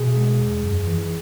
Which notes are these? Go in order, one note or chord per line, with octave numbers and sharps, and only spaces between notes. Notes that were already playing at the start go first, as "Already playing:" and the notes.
Already playing: B2 G#4
G#3
E2
F#2
E3